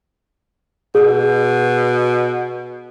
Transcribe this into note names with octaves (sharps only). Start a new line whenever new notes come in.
B2 G#4